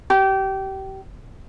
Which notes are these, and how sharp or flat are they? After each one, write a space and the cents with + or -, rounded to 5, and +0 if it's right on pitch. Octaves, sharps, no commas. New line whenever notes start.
G4 -25